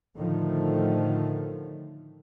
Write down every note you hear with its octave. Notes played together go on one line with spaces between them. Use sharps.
A2 D3 D#3 F3 A3